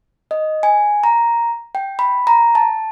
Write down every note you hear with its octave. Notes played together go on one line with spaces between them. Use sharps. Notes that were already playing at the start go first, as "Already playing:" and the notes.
D#5
G#5
A#5
G5
B5
A#5
A5